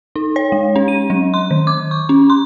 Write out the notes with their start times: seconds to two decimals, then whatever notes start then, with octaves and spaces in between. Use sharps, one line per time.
0.16 D#4
0.36 C#5
0.52 G#3
0.76 C#4
0.88 D#7
1.10 F#3
1.34 C6
1.51 D#3
1.67 D6
1.91 C#6
2.09 C#4
2.30 C6